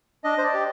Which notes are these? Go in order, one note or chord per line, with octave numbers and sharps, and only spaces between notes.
D4 D#5
C5
D5
G4